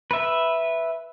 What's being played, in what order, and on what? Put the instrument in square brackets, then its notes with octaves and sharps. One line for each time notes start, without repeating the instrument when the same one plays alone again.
[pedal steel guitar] B4 E5